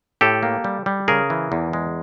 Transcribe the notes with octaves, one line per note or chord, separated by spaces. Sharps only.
A2 G4 A4
A#3
G3
G3
C#3 G#4 A#4
E3
E2
G#3